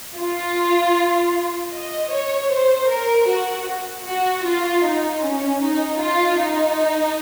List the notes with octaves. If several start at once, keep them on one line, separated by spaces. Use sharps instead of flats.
F4
D#5
C#5
C5
A#4
F#4
F#4
F4
D#4
C#4
D#4
F4
D#4